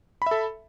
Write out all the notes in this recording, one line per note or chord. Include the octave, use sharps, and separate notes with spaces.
A4 E5 B5